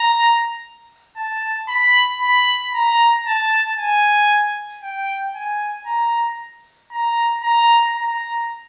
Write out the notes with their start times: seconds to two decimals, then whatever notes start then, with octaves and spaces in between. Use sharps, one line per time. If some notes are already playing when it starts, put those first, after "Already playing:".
Already playing: A#5
1.17 A5
1.68 B5
2.21 B5
2.73 A#5
3.26 A5
3.78 G#5
4.83 G5
5.35 G#5
5.86 A#5
6.92 A#5
7.43 A#5
7.96 A#5